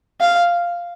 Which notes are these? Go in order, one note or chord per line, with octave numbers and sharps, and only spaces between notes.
F5